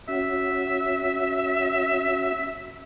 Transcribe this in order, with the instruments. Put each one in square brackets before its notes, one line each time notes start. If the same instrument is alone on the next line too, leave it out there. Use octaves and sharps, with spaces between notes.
[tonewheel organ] C#4 F#4 [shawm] E5